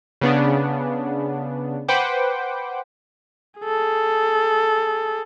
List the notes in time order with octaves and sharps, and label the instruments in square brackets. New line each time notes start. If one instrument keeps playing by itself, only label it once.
[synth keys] C#3 B3 D4
B4 C5 F#5 G5 D6
[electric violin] G#4 A4